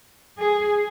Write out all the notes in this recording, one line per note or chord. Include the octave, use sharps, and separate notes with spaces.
G#4